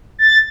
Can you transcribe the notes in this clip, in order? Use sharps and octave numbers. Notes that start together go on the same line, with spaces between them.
A6